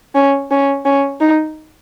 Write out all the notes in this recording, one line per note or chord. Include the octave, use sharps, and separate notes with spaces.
C#4
C#4
C#4
D#4